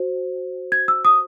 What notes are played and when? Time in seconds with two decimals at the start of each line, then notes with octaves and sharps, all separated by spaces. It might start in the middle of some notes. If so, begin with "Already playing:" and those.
Already playing: F#4 C5
0.72 G#6
0.88 E6
1.05 D#6